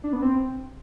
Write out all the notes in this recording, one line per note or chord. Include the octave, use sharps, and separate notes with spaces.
D4
B3
C4